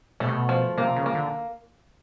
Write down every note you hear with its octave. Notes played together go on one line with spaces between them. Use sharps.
B2 A3
C3
B2
F3
C3 A#3
C#3
A#3
D3